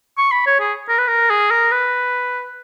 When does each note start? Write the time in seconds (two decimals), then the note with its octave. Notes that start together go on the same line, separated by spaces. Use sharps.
0.18 C#6
0.32 B5
0.47 C#5
0.60 G#4
0.89 A#4
0.98 B4
1.08 A#4
1.30 G#4
1.51 A#4
1.72 B4